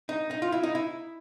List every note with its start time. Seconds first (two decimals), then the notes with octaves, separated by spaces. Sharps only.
0.09 D#4
0.31 D#4
0.42 F4
0.52 E4
0.63 D#4
0.75 E4